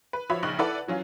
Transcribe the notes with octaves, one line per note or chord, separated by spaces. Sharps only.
B4
F3 F#4 C#5 E5 B5
A#1 C#3 D#4 C#6 F#6 F#7
E4 A4 B4 D5 F#5
E3 F#3 C#4 F4